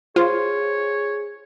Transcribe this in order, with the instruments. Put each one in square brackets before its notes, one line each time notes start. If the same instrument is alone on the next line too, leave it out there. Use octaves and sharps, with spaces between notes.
[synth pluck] F4 [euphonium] G#4 [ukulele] C5 [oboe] C#5